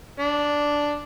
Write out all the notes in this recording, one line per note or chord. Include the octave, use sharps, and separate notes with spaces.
D4